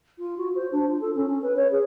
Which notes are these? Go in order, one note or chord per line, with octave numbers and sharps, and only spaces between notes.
F4
F#4
C5
D4
F4
A4
C#4
C#4
B4
C#5
G#4